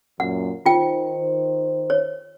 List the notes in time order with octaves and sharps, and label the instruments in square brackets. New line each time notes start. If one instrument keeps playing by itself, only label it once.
[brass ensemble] F#2 A#2 [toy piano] F#5
[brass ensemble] D#3 C5 [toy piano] F4 G5
[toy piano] C#5